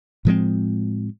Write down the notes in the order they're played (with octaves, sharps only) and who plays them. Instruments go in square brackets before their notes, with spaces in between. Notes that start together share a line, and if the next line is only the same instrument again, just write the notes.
[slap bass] A2 F3 G#3 C4